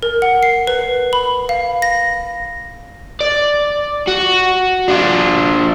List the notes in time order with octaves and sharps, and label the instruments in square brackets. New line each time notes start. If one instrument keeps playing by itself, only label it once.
[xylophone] A#4
F#5
C7
B4
B5
F5
A#6
[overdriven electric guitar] D5
F#4
D4 F4